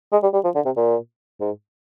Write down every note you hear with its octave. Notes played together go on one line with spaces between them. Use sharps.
G#3
G3
G3
F3
D3
C3
A#2
G#2